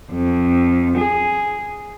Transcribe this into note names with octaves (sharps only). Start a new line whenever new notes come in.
F2
G#4